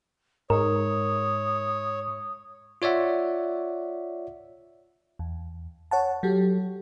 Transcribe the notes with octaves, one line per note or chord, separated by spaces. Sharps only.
G#2 A#4 C#5 D#6
F4 C#5 D5 E5 F#5
E2
C#5 F#5 A5
F#3 G4 A4